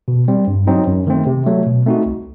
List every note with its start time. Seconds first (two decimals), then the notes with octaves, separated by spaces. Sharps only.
0.08 B2
0.28 G3 C4
0.47 G2
0.67 F#3 C4 D#4
0.87 F#2
1.07 D#3 A3 C4
1.27 C3
1.46 F#3 A3
1.66 B2
1.86 A3 C4 D#4 F#4
2.06 C2